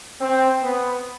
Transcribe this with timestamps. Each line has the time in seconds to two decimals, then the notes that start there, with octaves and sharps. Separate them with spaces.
0.20 C4
0.62 B3